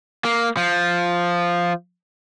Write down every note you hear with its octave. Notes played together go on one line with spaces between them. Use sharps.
A#3
F3